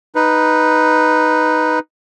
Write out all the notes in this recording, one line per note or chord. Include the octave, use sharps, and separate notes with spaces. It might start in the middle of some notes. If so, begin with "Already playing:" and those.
D#4 B4